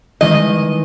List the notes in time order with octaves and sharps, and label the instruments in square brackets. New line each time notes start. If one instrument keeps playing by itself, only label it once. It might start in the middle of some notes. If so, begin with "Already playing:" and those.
[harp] D#3 E3 G#3 [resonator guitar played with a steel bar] D#5